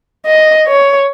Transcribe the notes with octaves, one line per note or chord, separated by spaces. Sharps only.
D#5
C#5